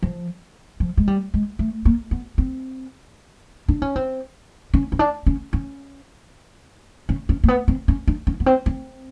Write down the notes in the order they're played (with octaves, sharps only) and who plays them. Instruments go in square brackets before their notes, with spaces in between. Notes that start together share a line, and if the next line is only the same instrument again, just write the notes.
[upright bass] F3
F3
G#3
G3
G#3
A3
A#3
B3
C4
D4
C#4
C4
C#4
C#4
D4
C#4
C#4
C#4
C#4
A#3
B3
C4
C#4
D4
C#4
B3
C4
C4